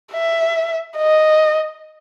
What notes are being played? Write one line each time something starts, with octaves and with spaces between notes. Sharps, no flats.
E5
D#5